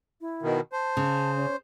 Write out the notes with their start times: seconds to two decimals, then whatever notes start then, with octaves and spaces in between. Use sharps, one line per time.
0.21 E4
0.42 B2 D#3
0.72 C5 A5
0.97 C#3
1.36 C#4